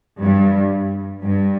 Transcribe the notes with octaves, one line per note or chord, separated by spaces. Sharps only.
G2
G2